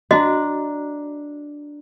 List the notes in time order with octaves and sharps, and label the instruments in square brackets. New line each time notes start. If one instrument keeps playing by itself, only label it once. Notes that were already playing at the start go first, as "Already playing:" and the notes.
[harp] D4 A#5 [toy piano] F#4 D#5